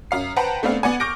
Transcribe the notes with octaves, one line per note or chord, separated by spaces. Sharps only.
F#2 F5 C7
B4 C5 F#5 G5 A5 A#5
A3 B3 C4 D4 F5
B3 D5 F#5 G#5
C#6 D6 F6 G6 A#6 D7